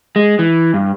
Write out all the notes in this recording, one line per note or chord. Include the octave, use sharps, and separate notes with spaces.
G#3
E3
G2